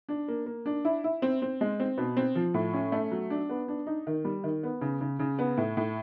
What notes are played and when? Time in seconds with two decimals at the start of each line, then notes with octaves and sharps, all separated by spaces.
0.09 D4
0.28 A#3
0.46 A#3
0.66 D4
0.85 E4
1.04 E4
1.22 C4
1.42 C4
1.61 G#3
1.80 C4
1.98 B2
2.17 C4
2.35 F3
2.54 A2
2.74 C#4
2.92 A3
3.11 F#3
3.30 D4
3.49 B3
3.68 D4
3.87 D#4
4.07 D#3
4.25 G3
4.44 D#3
4.63 B3
4.81 C#3
5.01 C#3
5.19 C#3
5.39 B3
5.57 A2
5.77 A2